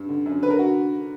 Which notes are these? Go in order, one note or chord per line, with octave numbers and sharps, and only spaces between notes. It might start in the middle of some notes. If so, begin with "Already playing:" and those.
Already playing: G2
D3
F#2
D3 B4
A#4
F#4